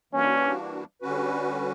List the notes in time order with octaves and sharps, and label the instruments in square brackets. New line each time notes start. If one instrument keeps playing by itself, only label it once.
[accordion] E3 G3 A#3 D4 F#4 [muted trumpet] C#4
[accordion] D3 G3 C#4 F#4 B4